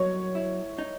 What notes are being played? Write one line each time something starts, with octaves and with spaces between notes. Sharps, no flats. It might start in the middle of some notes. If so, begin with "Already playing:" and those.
Already playing: F#3 C#5
E4
D#4